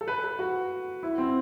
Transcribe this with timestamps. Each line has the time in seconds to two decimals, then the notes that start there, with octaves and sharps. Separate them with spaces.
0.01 A4
0.08 B4
0.24 B4
0.39 F#4
1.03 E4
1.18 C4